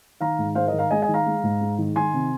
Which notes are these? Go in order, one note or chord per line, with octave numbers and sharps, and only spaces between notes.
D#3 F5 A#5
G#2
G#3 C5 F5
A#4 D#5
D#3
F5 A#5
G#3 D#5 G#5
D#5 G#5
D#3
F5 A#5
G#3
G#2
G#3
D#3
D#3 G#5 C6
C3